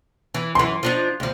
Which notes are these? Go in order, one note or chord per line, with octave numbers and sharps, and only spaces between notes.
E3
F#2 E3 C6
F3 D4 D#4
D2 F3